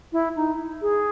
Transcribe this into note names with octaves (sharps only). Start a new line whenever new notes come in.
E4
D#4
G#4